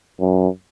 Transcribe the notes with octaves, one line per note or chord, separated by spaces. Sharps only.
F#2